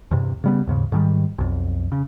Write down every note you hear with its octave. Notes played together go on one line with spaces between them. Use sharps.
E2 G2 C3
C#3 G3 B3
D#2 G#2 C#3
G#2 D#3 G3
B1 F2
C#3